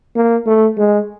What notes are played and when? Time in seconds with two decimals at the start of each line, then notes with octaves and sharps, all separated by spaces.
0.15 A#3
0.46 A3
0.77 G#3